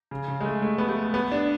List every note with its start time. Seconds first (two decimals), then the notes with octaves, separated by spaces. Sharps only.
0.11 C#3
0.28 C#3
0.40 G#3
0.45 A3
0.62 A3
0.78 B3
0.89 A3
1.14 B3
1.32 D4